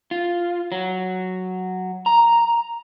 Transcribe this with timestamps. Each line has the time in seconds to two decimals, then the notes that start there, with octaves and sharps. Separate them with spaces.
0.11 F4
0.72 F#3
2.06 A#5